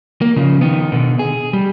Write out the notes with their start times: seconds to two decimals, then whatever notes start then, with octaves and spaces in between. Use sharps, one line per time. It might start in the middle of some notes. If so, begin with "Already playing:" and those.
0.21 A#3
0.36 C#3 F3
0.61 D#3 B3
0.92 B2 D3
1.19 G#4
1.53 G3